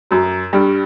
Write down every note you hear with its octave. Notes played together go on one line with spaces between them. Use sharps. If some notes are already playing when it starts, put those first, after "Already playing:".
F#2 F#3
G2 G3